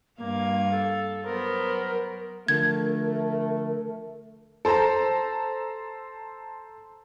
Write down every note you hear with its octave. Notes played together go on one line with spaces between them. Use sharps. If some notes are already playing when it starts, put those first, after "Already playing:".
G2 A#3 F5 G#6
A4
F#3 B3 A#4 C5
D3 F3 A3 A#4 G#6
A4 C5 A5 A#5